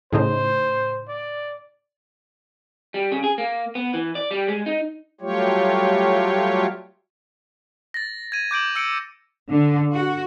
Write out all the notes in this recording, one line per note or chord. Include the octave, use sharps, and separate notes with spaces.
A2 C#3 D#4 C5
D5
G3
C#3
G#4
A#3
B3
E3
D5
G3
G#3
D#4
F#3 G3 A3 F4 G4 C#5
A6 A#6
G#6 D#7
D6 G6 D7 F#7
E6 C#7 D7 F#7
D3
F#4